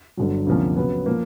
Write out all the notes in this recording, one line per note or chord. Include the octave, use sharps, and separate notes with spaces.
G1 G2 D3 F#3
D2 C3 F3 A#3 C#4
C#3 F#3 B3
F3 A#3